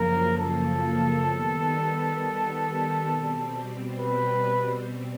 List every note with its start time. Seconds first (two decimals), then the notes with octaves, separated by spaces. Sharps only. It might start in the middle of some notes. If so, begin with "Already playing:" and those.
Already playing: F#2 C#3 F3 A#3 A#4
0.38 A4
1.28 D#3 G3 B3
3.09 B2 G3 C4
4.00 B4